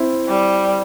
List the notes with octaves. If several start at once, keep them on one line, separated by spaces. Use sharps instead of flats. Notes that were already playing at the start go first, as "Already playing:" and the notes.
Already playing: C4 E4
G3